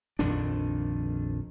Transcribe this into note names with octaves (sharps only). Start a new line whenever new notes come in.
A#1 F2 D#3 D4